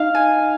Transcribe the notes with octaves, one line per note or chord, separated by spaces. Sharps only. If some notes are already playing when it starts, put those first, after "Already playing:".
Already playing: D#4 F5
G#5